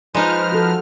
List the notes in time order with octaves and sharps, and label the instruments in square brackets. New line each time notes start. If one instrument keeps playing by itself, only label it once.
[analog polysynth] F3 F6 [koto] G#3 D#4 [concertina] B4 C5 A#5
[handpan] F#4 A4